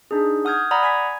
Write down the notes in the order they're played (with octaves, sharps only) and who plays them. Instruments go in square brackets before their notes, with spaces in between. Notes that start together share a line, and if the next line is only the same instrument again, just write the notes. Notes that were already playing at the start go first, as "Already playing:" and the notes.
[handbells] D4 D#4 G#4
F#5 D#6 F6 G6 G#6
D5 F#5 A#5 B5 D#6
G#5 G#6 B6